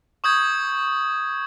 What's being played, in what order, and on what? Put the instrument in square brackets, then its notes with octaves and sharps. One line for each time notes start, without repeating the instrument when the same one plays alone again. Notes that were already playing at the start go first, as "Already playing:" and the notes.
[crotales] C#6 D#6 G6 G#6